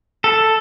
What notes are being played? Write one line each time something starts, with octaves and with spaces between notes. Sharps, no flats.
A4